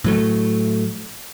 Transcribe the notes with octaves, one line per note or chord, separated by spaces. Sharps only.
A2 F#3 A3